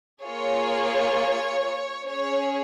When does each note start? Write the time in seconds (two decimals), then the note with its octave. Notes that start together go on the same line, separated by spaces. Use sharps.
0.23 A#3 F4 G#4 C#5
2.06 C#4 G#4 C#5